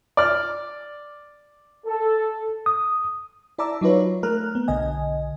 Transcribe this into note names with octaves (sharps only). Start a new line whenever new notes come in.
D5 F6
A4
D#6
E4 D5 A5 A#5 D6 E6
F#3 D#4 F4 B4 C#5
A3 A#4 A#5 F6 F#6
B3
B1 D3 D#5 G#5